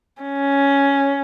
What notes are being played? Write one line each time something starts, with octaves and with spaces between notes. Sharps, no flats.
C#4